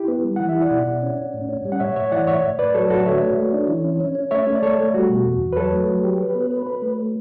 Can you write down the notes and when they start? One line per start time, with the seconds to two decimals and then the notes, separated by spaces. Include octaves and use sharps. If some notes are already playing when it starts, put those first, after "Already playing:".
Already playing: E4 G4
0.08 B3
0.24 G3
0.36 E3 F#5
0.49 E5
0.55 E4
0.62 D5 F#5
0.70 B2
0.87 B2
1.02 C#4
1.18 C#4
1.34 A2
1.49 C#4
1.65 G3
1.72 F#5
1.80 A2 C#5 E5
1.96 A2 C#5 E5
2.12 E3 D5 F#5
2.27 A2 C#5 E5
2.43 A2
2.59 A2 B4 D5
2.74 F#3 A4 C#5
2.90 A2 F#4 A4
3.05 D3 C#5 E5
3.22 A3
3.37 A3
3.53 D4
3.68 E3
3.84 C#4
4.00 C#4
4.15 C#4
4.31 A3 C#5 E5
4.47 A3
4.55 D5
4.63 A3 A4 C#5
4.79 A3
4.94 G3 F#4
5.10 B2
5.25 E2
5.41 E2
5.53 B4
5.56 F#3 A4 C#5
5.73 A3
5.88 F#3
6.04 G4
6.19 B4
6.35 B3
6.51 B4
6.67 B4
6.82 A3